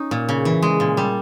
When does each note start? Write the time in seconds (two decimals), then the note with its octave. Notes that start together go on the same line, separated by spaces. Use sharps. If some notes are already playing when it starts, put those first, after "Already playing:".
Already playing: C#4 D#4
0.11 A#2
0.29 C#3
0.45 E3
0.62 G#3
0.80 A#2
0.97 G3